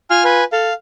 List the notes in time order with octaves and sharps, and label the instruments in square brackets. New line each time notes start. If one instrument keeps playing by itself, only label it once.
[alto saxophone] F4 [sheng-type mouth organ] G#5 F6
[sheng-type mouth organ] B4 G#5
[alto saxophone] A4 [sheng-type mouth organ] F5